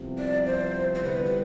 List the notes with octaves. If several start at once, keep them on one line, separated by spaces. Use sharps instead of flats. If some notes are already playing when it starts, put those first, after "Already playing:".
Already playing: C2 C3 F3 B3
D5
C5
C5
D3 G3 B3 E4 B4
B4